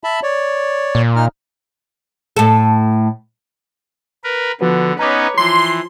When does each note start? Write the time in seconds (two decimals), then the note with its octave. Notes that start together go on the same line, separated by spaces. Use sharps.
0.04 E5 A5 B5
0.23 C#5 D5
0.95 A#2
1.16 D#4 F6
2.37 A2 A4
4.24 A#4 B4
4.61 D3 F3 B3 F#4 B4
4.99 B3 C#4 D#4 B4 C#5 A#5 D6
5.38 E3 F3 C6